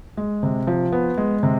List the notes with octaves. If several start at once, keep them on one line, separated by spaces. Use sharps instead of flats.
G#3
C3
F3
B3
G#3
C3